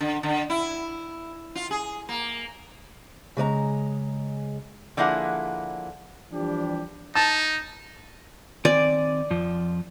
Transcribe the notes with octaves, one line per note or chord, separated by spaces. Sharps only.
D3
D3
E4
F4
G#4
A#3
C#3 G#3 D5 A#5
D3 F3 A#3 E4 G#4 F#5
E3 F3 G3 D4 G4
D#4 A5
D#3 C4 D5 G#5
F2 F3